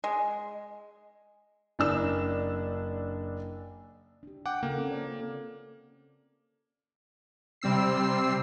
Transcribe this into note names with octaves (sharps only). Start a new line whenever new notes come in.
G#3
F#1 D4 E6
D4 G4
F#5 G5 D6
C#3 A#3 F4 A4
C4 C#4 A4
D5
C3 G3 C4 E6 C7